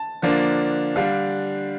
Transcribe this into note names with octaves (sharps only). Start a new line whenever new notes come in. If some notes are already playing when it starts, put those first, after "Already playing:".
Already playing: A5
D3 F3 A#3 D4
D3 G3 D4 F5